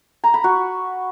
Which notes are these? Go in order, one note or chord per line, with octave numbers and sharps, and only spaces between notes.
A#5
B5
F#4